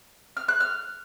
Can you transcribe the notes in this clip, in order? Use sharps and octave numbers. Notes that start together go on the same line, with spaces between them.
F6
F#6
F6